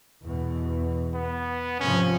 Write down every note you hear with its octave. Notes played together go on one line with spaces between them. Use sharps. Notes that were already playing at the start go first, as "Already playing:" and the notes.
E2 B2
B3
G#2 C3 F3 C#4